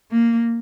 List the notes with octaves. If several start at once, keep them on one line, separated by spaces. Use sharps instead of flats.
A#3